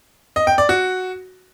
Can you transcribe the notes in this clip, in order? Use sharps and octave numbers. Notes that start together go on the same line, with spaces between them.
D#5
G5
D5
F#4